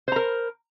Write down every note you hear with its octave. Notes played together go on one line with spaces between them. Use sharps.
A#4 C5 A#5